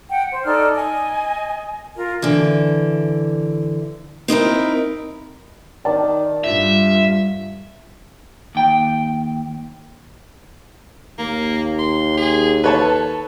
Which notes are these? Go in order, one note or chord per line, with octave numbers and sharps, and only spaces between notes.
F#5 G5
C5
D#4 A4 D5 F6
D#5 G#5
F4 A#4
D3 E3
C4 D#4 E4 A#4
D#3 D5 A5
G2 F4 E5
D#2 G5
D#2 A#3
C6
G#4
A4 B4 C#5 A5